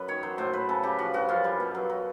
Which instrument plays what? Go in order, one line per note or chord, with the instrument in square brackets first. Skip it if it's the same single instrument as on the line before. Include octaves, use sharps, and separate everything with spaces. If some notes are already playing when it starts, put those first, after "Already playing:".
Already playing: [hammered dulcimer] F#2 B4
D#3 C#5
F#3 C5
A2 C5
A2 B4
C#3 A4
C#3 G4
F3 F#4
G2 F#4
F#2 F4
G3
B2
F#3
F#3